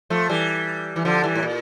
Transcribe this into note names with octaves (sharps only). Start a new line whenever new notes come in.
F3 A3
E3 G3
E3
D3 F3
E3 G3
A2
A#2